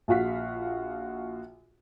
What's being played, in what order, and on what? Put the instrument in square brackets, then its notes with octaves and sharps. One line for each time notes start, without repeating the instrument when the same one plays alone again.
[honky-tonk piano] A#1 F4 F#4 F5 B6